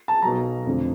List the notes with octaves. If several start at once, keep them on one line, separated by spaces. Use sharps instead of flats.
A5
B1 B2 F#3 A#5
F1 F2 D3